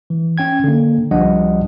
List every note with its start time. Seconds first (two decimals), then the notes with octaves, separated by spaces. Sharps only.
0.10 E3
0.38 C#4 G5 G#6
0.64 D3 A#3
1.11 C2 F3 G3 D4 D#5 F#5